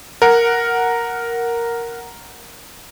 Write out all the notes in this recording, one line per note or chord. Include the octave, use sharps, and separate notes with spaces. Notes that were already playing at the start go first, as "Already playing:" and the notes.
A#4 F#5